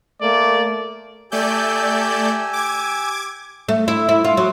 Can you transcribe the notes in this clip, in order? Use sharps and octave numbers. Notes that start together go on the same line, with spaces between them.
A3 A#3 D5
A3 G4 D5 G#5 E6 G6
D6 G#6
A3
E4
E4
F4
F#3